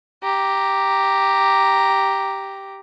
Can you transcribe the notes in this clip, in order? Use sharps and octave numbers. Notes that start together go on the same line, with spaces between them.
G4 A#5